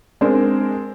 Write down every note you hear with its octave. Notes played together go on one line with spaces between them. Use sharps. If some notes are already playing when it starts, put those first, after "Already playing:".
G#3 C4 D4 A#4 C5